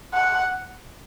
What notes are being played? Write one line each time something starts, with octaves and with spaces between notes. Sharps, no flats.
F#5